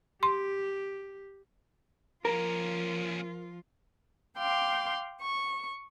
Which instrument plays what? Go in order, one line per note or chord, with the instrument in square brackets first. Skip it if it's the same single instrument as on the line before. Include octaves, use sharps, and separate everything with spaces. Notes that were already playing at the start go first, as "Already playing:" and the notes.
[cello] G4 [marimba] C6
[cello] F3 F4 [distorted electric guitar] A#3 C#4 [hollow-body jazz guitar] A#4
[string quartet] F5 G5 C6 D6
C#6